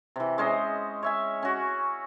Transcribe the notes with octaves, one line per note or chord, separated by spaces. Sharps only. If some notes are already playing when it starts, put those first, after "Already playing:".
C3 E3
G#3 C#4 C5 D#5
C#5 E5 G#5
C#4 F#4